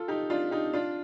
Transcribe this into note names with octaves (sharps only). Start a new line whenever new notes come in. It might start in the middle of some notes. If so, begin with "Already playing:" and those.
Already playing: F4 A4
D#4 G4
D4 F4
D#4 G4
D4 F4